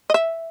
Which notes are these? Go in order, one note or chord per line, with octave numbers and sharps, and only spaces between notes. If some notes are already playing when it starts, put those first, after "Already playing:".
D#5
E5